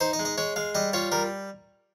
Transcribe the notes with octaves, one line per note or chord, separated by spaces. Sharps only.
D#4 C5
D#5
G#3
D#5
G#3 C#5
G#3 F5
G3 D#5
F4 C#5
G3 A#4